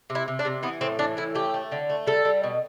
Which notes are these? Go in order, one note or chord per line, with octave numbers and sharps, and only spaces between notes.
C3
E4
C3
D4
C3
E3 B3
A2 C4
E3 D4
A2 E4
A3 G4
A3
D3
A3
G3 A4
G3
B2